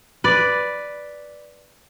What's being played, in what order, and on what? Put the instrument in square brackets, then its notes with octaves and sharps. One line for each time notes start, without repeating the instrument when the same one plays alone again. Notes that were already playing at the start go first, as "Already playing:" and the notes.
[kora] B4 D5